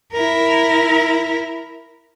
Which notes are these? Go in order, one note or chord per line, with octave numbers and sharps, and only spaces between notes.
E4 A#4